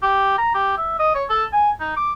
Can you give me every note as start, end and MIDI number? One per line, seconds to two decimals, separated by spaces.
0.03 0.37 67
0.38 0.54 82
0.55 0.75 67
0.78 0.97 76
0.99 1.11 75
1.15 1.24 73
1.30 1.44 69
1.53 1.70 80
1.80 1.95 63
1.97 2.13 86